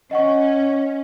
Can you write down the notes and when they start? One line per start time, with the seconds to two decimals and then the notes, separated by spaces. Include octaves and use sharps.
0.11 C#4 D#5 F#5 C#6